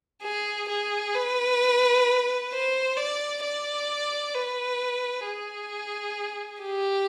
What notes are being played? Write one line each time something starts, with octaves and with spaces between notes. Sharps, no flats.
G#4
G#4
B4
C5
D5
D5
B4
G#4
G4